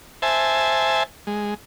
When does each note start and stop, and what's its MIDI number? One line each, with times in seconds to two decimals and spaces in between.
0.22 1.03 72
0.22 1.03 76
0.22 1.03 80
0.22 1.03 81
1.27 1.54 56